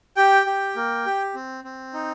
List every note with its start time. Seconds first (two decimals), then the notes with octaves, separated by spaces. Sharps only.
0.17 G4 G5
0.47 G4
0.76 A#3
1.06 G4
1.35 C4
1.64 C4
1.94 D#4